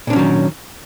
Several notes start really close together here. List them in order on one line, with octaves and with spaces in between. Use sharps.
A#2 D4 C#4 F#3 D#3